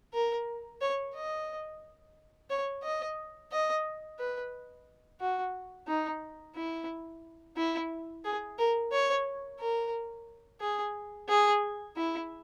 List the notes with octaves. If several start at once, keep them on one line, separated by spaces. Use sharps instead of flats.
A#4
C#5
D#5
C#5
D#5
D#5
B4
F#4
D#4
E4
E4
G#4
A#4
C#5
A#4
G#4
G#4
E4